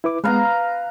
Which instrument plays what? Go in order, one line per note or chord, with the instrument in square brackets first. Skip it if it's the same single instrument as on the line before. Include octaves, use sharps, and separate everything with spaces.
[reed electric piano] E4 B4 D6
[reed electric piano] G#3 B3 [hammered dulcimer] B4 F5 A#5
[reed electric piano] F6